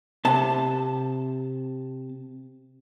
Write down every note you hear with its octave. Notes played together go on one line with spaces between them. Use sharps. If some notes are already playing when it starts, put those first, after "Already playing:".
C3 A5